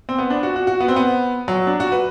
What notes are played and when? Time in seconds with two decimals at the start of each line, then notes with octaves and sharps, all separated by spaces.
0.09 C4
0.18 B3
0.30 D4
0.43 F#4
0.56 F#4
0.67 F#4
0.80 B3
0.88 C4
0.96 B3
1.48 F#3
1.67 D4
1.80 F#4
1.92 B4